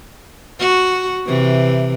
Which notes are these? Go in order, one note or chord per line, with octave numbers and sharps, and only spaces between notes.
F#4
C3 E3